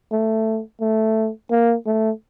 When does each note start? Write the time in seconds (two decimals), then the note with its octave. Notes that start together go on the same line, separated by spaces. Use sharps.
0.12 A3
0.81 A3
1.50 A#3
1.86 A3